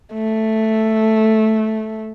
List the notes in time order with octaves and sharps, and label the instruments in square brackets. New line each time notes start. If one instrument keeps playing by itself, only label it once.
[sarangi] A3